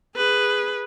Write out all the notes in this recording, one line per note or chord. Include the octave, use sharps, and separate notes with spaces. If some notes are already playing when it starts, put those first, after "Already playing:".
G#4 B4